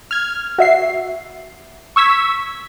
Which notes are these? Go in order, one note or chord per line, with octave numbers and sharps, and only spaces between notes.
F6 G#6
F#4 E5 C7
C#6 E6 G#6 B6